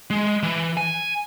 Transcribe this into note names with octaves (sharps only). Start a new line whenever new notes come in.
G#3
E3
G#5